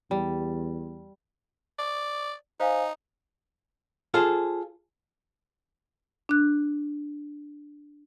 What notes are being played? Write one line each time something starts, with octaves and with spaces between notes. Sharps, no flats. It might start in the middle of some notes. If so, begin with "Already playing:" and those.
E2 G3
D5
D#4 C5 F5 G#5
F4 G#4 A4 C5
D4 F#6